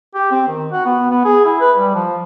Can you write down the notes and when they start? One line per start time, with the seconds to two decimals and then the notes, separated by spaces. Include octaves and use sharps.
0.15 G4
0.31 C4
0.48 D#3
0.71 F#4
0.85 B3
1.10 B3
1.25 G#4
1.44 E4
1.60 B4
1.77 G3
1.94 F3